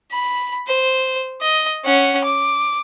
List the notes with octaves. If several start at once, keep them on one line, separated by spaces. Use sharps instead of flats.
B5
C5
D#5
C#4 F#5
D6